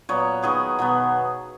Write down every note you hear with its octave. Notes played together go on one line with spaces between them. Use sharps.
A#2 F#3 B3 C#5
D#3 F#3 B3 G#4
B2 F#3 B3